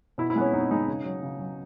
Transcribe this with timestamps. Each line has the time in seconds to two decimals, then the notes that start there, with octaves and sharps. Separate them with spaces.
0.18 B2 E4
0.30 E4
0.36 G#3 B3
0.41 C#4
0.53 B2 D#4
0.71 G#3 D#4
0.88 C#3
1.05 F#3
1.23 C#3
1.40 F#3